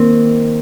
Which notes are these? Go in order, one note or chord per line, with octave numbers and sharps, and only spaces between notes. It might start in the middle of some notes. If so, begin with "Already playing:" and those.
Already playing: D#3 A#3 C4